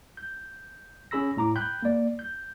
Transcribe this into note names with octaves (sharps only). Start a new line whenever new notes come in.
G6
C#4 G#4 B5 E6 A#6
A2 A#5 D6
G5 B5 F#6 G6
A#3 D5
G6